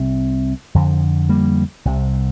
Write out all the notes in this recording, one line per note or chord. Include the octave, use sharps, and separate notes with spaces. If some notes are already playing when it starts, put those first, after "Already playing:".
Already playing: C2 C3
F2 D3
G3 A#3
C2 C3